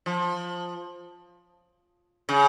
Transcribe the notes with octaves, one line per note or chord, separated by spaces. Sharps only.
F3
C#3